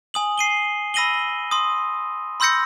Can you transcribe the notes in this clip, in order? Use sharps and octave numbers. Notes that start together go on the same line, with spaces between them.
G#5 D#6 F#7
C7 D#7 G7
B5 E6 A#6 D#7 F#7 G7
C6 D#6
B5 C6 E6 G6 A#6 C#7